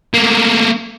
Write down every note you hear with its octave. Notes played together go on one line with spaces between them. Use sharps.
A3 A#3